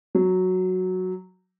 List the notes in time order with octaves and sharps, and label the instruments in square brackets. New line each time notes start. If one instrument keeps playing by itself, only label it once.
[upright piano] F#3